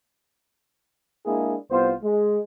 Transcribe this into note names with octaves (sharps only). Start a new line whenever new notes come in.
G#3 A#3 D4 E4 G#4
C2 B3 F4 C5
G#3